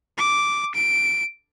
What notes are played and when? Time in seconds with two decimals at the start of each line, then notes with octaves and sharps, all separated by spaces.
0.17 D6
0.75 D7